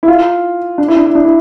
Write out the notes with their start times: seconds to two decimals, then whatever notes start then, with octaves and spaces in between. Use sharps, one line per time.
0.03 E4
0.08 F4
0.78 D4
0.88 E4
0.97 D4
1.06 E4
1.15 D4
1.25 E4